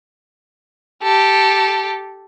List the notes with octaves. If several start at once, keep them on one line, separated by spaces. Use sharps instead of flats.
G4 A4